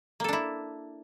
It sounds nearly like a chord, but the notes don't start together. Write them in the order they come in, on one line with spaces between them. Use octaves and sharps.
A#3 A4 D4 E4